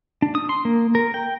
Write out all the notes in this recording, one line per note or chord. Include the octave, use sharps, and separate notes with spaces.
D4
D#6
C6
A#3
A#4
G5